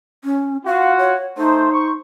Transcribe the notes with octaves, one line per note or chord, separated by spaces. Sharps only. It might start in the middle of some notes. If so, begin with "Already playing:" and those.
C#4
F4 F#4 F5
C#5
A3 D#4 C5
C5 C#6